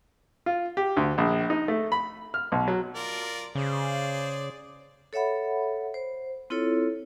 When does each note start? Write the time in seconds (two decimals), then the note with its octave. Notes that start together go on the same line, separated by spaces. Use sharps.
0.46 F4
0.77 G4
0.97 D2
1.18 A#1
1.50 D#4
1.68 A3
1.92 B5
2.34 F6
2.52 B1
2.68 F#3
2.95 F4 A#4 D5
3.55 C#3 G#4 C5 D5
5.13 A4 C#5 E5 F#5 B5
5.94 C5
6.50 C4 E4 F4 A4 C#5